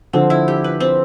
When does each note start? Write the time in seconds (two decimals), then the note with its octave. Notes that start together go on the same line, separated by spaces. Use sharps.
0.13 D3 F3 C4
0.30 E4
0.48 G4
0.64 B4
0.80 C4